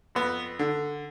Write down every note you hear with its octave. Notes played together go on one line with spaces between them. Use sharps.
F2 B3
D3